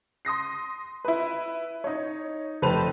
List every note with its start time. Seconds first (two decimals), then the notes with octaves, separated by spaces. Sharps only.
0.25 C6 D#6 A#6 C7
1.05 E4 B4
1.84 D#4 C#5
2.62 F1 B4 C5 A5 F7